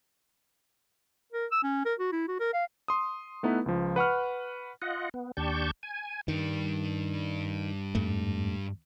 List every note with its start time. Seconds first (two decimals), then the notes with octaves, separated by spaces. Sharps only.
1.33 A#4
1.51 E6
1.63 C#4
1.85 A#4
1.99 F#4
2.12 E4
2.28 F#4
2.40 A#4
2.53 F5
2.88 C6 D#6
3.43 A3 B3 D#4 E4 B4
3.66 C#2 F3
3.96 B4 F#5 C#6 F6
4.82 F4 D#5 F#5
5.14 B3
5.37 D#2 D4 G4 A5 C#6 G6
5.83 G#5
6.28 G2 D#3 D4
7.95 F2 G#2 A3